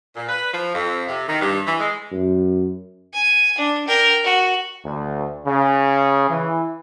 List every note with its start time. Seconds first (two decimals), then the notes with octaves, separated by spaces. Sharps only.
0.16 A#2
0.29 B4
0.53 F3
0.74 F2
1.08 C3
1.27 D#3
1.42 G2
1.67 E3
1.79 G#3
2.12 F#2
3.13 G#5
3.58 D4
3.88 A#4 G5
4.24 F#4
4.85 D2
5.46 C#3
6.29 E3